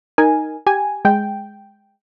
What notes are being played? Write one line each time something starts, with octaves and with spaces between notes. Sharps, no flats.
D#4 A#4 G#5
G4 G#5
G#3 G5